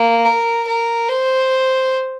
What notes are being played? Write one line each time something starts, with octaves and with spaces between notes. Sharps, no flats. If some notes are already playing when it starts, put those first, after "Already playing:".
Already playing: A#3
A#4
A#4
C5